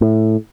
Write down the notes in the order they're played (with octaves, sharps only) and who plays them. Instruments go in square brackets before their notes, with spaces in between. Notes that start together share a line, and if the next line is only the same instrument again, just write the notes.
[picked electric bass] A2